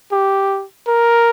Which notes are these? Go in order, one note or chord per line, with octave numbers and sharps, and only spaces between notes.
G4
A#4